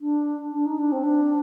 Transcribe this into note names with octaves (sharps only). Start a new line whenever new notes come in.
D4
D4
D#4
D4
C4
D4